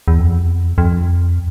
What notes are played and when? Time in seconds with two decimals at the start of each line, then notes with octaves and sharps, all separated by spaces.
0.08 E2
0.19 F2
0.78 F2